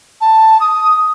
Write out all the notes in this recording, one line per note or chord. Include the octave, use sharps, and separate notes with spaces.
A5
D#6